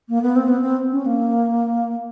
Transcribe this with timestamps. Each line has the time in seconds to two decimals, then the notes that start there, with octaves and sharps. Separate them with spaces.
0.09 A#3
0.22 B3
0.36 C4
0.48 B3
0.62 C4
0.91 C#4
1.06 A#3